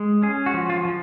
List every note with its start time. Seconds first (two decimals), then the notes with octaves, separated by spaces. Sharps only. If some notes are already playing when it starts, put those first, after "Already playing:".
Already playing: G#3
0.23 C#4 G#4
0.46 F#4
0.54 F3
0.70 F4
0.85 F3